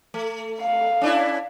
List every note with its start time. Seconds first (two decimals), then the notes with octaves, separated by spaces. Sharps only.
0.14 A3
0.62 F5
1.01 C#4 D4 E4